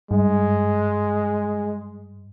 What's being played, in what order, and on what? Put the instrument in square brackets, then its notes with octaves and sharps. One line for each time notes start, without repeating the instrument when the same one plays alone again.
[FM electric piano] G2 [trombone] G#3